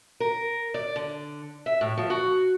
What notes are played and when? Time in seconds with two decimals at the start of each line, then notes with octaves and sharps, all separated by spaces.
0.20 A#4
0.74 D5
0.96 D3
1.66 E5
1.81 A2
1.98 F3
2.10 F#4